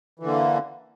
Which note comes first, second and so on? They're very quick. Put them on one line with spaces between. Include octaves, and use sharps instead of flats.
E3 D3 A#3